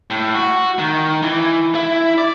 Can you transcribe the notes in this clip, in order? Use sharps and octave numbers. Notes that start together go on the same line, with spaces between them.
A2
F#4
D#3
E3
E4
D5